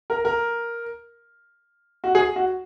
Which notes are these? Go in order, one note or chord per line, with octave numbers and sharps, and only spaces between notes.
A#4
A#4
F#4
G#4
F#4